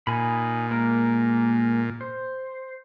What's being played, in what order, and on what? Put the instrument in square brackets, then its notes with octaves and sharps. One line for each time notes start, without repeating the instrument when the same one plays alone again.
[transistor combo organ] A#2 [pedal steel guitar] D#4 G#5 B5
[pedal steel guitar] G#3 A#3 A#4
C5